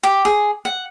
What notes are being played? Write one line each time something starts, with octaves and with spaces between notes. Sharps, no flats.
G4
G#4
F#5